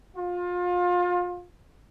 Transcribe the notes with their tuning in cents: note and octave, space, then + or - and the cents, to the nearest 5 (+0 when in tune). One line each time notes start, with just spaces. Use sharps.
F4 +30